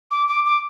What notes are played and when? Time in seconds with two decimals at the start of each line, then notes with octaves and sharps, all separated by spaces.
0.11 D6
0.28 D6
0.45 D6